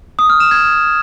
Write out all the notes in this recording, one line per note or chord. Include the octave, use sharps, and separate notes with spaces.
D#6
F6
E7
G#6